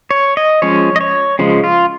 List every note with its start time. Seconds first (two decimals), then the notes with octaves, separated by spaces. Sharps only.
0.11 C#5
0.37 D#5
0.62 F3 G#3 C#4 C#5
0.96 D#5
1.01 C#5
1.39 C#3 F3 G#3
1.64 F4